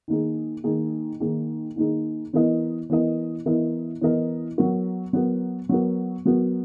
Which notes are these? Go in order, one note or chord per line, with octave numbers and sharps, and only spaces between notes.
D#3 A#3 D#4 G#4
D#3 A#3 D#4 G#4
D#3 A#3 D#4 G#4
D#3 A#3 D#4 G#4
E3 B3 E4 A#4 D#5
E3 B3 E4 A#4 D#5
E3 B3 E4 A#4 D#5
E3 B3 E4 A#4 D#5
F#3 B3 F#4 A#4
F#3 B3 F#4 A#4
F#3 B3 F#4 A#4
F#3 B3 F#4 A#4